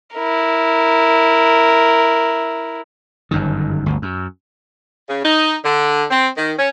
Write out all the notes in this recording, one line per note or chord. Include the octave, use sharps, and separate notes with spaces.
E4 A#4
G1 F#2 D#3
G1 D2
F#2
C#3
D#4
D3
C4
D#3
C#4